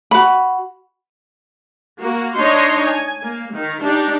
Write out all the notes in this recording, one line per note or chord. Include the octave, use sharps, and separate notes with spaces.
F#4 B5
A#3 F#4
D4 D#4 C#5 D#5 C6
G#5
A#3
D#3
D4 D#4 G4